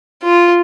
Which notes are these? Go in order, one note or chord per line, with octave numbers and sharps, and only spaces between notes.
F4